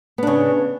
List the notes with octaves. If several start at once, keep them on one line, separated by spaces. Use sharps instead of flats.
C#3 B3 D4